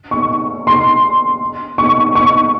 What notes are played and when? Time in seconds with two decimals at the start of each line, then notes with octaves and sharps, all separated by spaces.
0.11 C#6
0.67 C6
1.78 C#6
2.15 C#6